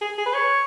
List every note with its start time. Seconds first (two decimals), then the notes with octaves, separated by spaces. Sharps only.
0.01 G#4
0.18 G#4
0.26 B4
0.34 C#5